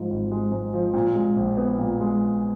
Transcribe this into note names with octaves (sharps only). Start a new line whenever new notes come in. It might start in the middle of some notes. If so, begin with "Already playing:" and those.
Already playing: G#2 F3
G#1
G#3
G#2
F3
A#2
G#3
A#1
B3
A#2
G#3